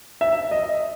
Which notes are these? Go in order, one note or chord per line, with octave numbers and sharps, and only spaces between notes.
E5
D#5